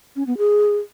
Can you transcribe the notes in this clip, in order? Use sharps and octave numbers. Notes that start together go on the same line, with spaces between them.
C#4
B3
G#4